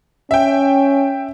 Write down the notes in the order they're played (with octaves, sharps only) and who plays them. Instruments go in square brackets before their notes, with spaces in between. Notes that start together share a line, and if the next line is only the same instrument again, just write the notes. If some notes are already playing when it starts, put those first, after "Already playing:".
[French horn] C#4 [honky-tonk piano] E5 G5